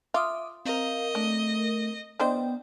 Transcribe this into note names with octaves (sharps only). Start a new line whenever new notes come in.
F4 E5 D6 D#6
C4 A#4 D#5 F5
A3 D4
E3 B3 D4 C5 D5 D#5 G5